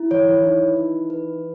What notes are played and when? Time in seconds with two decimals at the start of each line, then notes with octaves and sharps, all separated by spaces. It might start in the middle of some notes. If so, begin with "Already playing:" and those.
Already playing: E4
0.10 E3 C#5
0.28 E3
0.44 D#4
0.76 D#4
1.10 B4